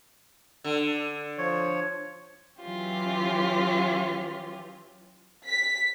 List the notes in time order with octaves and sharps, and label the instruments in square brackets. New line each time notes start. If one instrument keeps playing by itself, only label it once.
[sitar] D3
[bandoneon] F3 C#5
[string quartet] E3 F#3 C#4 F4 G4
[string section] B6